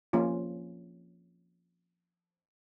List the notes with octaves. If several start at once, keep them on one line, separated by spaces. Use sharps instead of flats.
F3 A#3 C#4 F4